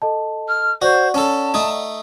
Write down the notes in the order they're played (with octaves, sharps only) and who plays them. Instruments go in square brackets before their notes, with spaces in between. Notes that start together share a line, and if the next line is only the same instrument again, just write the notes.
[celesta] A4 D#5 A5
[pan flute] F6
[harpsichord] F#4 [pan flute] C5 [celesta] D5 F#5 C#6
[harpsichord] C#4 A4 [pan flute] A5
[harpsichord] A3 D#4